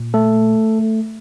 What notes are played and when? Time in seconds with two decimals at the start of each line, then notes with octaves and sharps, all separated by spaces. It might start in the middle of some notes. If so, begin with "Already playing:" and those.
Already playing: A#2
0.14 A3 A4